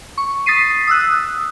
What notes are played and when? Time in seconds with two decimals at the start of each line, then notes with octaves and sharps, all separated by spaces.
0.18 C#6
0.46 D#6 A6 B6 C7 D#7
0.87 D#6 E6 F#6